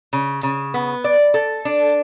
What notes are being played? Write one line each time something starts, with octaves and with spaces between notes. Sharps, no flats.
C#3
C#3
B3
D5
A4
D4